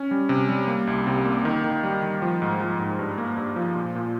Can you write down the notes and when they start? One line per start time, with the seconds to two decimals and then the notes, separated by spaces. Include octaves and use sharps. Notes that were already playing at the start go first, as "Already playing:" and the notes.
Already playing: C#4
0.11 G3
0.29 C3
0.49 G3
0.68 A#3
0.87 C2
1.07 C3
1.25 A#3
1.45 D#3
1.64 D#3
1.83 G3
2.02 D#3
2.22 F3
2.42 G#2
2.61 F3
2.79 G#2
2.99 G2
3.18 A#3
3.37 G2
3.56 F3
3.76 A#2
3.95 A#2